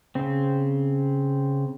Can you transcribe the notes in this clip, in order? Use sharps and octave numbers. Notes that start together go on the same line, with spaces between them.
C#3 C4